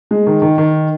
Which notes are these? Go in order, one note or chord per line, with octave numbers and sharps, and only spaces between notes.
G#3
D#3
D#3
D#3